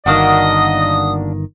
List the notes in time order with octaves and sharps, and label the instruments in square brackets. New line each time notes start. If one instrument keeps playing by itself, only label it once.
[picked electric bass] G1 D#3 [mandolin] A#3 D4 F#4 [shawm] D#5 [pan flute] D#6